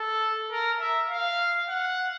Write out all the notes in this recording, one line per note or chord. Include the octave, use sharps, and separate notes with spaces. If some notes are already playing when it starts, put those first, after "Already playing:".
Already playing: A4
A#4
E5
F5
F#5